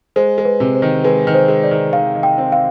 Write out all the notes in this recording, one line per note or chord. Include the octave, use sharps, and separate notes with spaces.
G#3 C5
G#3
B4
C3
C5
D#3
G#3 B4
D#3
C5
G#3
D5
D#3
D#3 F5
D#3
G5
C4
F5